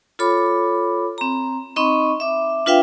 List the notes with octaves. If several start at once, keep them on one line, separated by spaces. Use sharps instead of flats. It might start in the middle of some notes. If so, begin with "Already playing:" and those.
F4 A4 C#5 B5 D6
C4 A#5
C4 D#4 D#5 B5 C#6
E5 D6
D4 F4 B4 E5 F5 G5